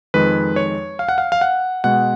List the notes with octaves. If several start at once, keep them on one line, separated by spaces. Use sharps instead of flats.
F2 D#3 G#3 B4
C#5
F5
F#5
F5
F5
F#5
B2 G#3 F#5